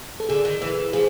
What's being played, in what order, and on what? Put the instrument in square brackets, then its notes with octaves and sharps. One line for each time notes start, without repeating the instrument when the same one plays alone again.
[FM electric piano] A4
[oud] D3 [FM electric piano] G#4
[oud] D#3
E3
[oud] F3 [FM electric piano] G#4